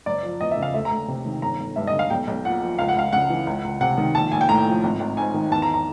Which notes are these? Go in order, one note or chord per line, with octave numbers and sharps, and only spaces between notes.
F#1 D5
F3
E2 D#5
E5
C#3
F5
D2 E5
A#5
D2
C3
D#3
G1 A#5
G1
G2 E5
D#5
D3
F5
B1 G5
B1
A#2 F#5
F3
C#2 F5
F#5
C#2 F5
C#3 F#5
E3
C#2
C#2
C3 F#5
D#3
A#1 A5
A#1 G#5
G5
A2 A#5
F3
G#1
G#1
G#2 G#5
D#3
E2 A5
A#5
A#5